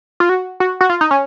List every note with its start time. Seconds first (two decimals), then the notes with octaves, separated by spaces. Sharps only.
0.20 F4
0.29 F#4
0.60 F#4
0.81 F#4
0.90 F4
1.01 D#4
1.11 C#4